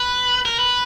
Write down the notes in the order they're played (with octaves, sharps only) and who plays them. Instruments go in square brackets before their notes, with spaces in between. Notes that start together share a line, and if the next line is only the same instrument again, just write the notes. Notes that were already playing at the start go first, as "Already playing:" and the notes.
Already playing: [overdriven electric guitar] B4
A#4
B4